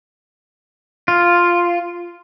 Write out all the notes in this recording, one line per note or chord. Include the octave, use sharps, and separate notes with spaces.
F4